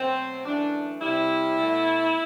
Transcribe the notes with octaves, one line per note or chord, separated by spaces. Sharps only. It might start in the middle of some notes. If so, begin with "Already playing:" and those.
Already playing: B2 F#3 A3 C4
F#2 E3 A3 D4
C3 G3 E4
B2 A3